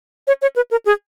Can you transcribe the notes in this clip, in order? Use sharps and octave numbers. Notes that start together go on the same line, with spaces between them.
C#5
C#5
B4
A#4
G#4